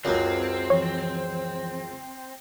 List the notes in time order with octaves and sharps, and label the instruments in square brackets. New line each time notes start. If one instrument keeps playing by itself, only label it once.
[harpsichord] C#2 F#2 [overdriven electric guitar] C4 [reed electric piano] A#4
[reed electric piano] E3 F3 [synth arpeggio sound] C#5